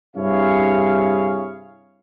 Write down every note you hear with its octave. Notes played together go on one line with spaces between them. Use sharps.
G2 C3 E4 G#4 C#5 F5